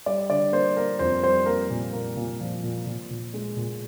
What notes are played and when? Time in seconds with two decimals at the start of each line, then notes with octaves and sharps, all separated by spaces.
0.06 G3 D5
0.30 D3 D5
0.52 A#3 C5
0.77 A#3 A#4
0.99 F2 C5
1.23 G3 C5
1.46 A#3 A#4
1.70 A#2
1.93 A#3
2.16 A#2
2.40 F3
2.64 A#2
2.86 A#2
3.10 A#2
3.34 G#3
3.56 A#2